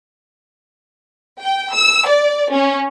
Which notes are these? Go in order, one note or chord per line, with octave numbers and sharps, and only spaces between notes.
G5
E6
D5
C#4